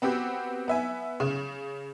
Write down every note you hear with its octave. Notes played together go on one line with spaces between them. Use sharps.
B3 C4 F#4 G4
B3 E5 G#5
C#3